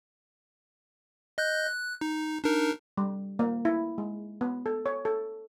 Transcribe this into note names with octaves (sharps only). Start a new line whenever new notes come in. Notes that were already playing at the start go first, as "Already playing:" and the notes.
D#5 F#6 G6
F#6
D#4
D4 D#4 A#4
G3
A#3
E4
G#3
B3
A4
C#5
A4